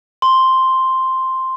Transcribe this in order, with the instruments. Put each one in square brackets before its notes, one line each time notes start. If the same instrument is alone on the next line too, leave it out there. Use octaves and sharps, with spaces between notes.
[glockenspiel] C6